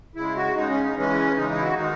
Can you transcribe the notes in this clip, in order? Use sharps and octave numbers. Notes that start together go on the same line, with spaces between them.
C#3 G#3 E4
F#4
C#3 G#3 D#4
C#4
D#4
C#3 E3 G#3 C#4
C#3 E3 G#3 D#4
D#4
E4
F#4
D#3 G#3 D#4